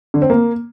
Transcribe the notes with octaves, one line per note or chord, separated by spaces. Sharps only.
D3
C4
A#3